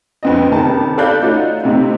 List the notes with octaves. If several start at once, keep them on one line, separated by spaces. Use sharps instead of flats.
F2 B3 C4 B4 D#5
F#1 C3 D#3 B3 A5
A4 D5 F5 B5 F#6 G6
A3 C#4 D#4 F4 F#4
A2 C3 C4 D#4